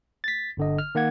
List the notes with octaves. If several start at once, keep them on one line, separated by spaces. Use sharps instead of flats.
A6 B6
G1 D3 D#5
F6
D#3 A#3 F#5 G#6